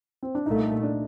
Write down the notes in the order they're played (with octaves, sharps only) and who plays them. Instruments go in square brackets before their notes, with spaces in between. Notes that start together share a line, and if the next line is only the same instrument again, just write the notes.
[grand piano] C4
D4
[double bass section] C2 A#2 A3 [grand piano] D#4
[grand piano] D4